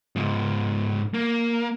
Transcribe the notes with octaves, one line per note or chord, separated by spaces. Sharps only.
G#2 F3
A#3